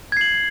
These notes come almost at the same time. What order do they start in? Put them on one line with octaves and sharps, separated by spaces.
G#6 C7 F#7